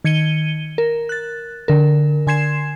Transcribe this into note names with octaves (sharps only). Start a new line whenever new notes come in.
D#3 G#6 C#7 D#7 G7
A#4
F#6 A6
D3 A#4
D3 G#5 C6 G#6 C7 E7